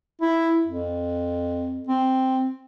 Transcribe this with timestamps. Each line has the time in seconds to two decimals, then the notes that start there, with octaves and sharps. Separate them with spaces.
0.21 E4
0.67 F2
1.88 C4